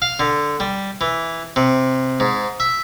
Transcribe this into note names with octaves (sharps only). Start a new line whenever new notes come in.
F5
D3
G3
E3
C3
G#2
E5